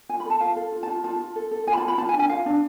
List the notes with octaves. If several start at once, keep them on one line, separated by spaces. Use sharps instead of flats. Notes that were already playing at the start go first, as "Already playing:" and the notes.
F4 G#5
B5
A4 A5
F4 F5
A4
F4
A5
F4
F4 A5
F4
A4
A4
F4 G#5
B5
A5
F4
B5
F4 A5
G#5
D4
G#5
F4 F5
D4